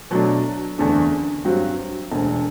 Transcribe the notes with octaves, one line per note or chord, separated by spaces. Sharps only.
B2 F#3 A3 D4
F#1 E2 D3 A3 D4
G2 F#3 C4 F#4
E1 D2 D3